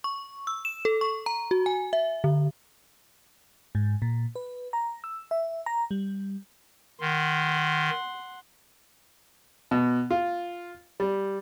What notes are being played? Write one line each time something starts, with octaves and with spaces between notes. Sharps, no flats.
C#6
E6
E7
A4
C#6
A#5
F#4
G#5
E5
D3
G#2
A#2
B4
A#5
E6
E5
A#5
G3
D#3 F#5 C6
B2
F4
G3